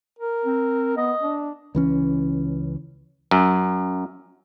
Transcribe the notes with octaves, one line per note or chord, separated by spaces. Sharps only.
A#4
C4
B3 D#5
D4
C#2 E3 C#4
F#2